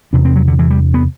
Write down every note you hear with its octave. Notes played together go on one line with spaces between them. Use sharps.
E2 C3 D4
C4
F#3
D3
E3
G3
B3